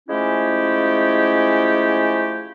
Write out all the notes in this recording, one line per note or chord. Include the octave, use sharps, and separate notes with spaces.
F3 G#3 A3 C#4 E4 G4